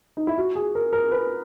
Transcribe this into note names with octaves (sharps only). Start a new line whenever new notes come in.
D#4
E4
F#4
G#4
A#4
A#4
B4